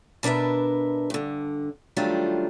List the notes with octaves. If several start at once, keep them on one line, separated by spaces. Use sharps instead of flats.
B2 D4 A#4 B4 E5
G2 D3
D#3 F#3 G3 A3 D4 F4